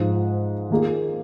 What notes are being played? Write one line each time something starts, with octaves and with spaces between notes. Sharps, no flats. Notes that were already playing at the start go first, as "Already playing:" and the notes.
Already playing: G#2 F3 G#3
D#3 A#3 F4 G#4